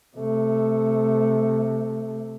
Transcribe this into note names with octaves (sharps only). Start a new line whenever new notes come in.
C3 A3